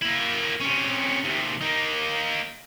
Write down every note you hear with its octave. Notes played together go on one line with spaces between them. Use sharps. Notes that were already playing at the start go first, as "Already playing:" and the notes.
A#3 E4
C3 C#4
D#2 C3
A#3 D#4